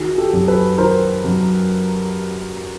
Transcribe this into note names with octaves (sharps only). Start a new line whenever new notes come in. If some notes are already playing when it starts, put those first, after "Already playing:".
Already playing: D#3 F#4 G#4
G4 A4
F#2
A4 B4
D#3 A#4 C5
F#2